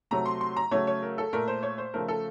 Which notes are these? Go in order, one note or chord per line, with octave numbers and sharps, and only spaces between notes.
C3 F#3 A3 A#5
C6
C6
A#5
C#3 F#3 A3 C#5
C#5
A#4
A4
A#2 A3 A#4
C5
C#5
C5
C#3 F3 A3 A#4
A4